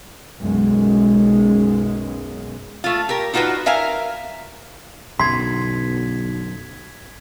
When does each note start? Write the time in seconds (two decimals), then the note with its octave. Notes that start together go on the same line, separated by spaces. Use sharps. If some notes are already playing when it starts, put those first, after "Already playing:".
0.41 B1 F#2 G#3
2.84 A3 F4
3.09 G4 A#4
3.34 D#4 F4 F#4 G#4 B4
3.66 A#4 E5 F5 G#5 A#5
5.19 B1 F#2 B2 D3 C6 G#6 B6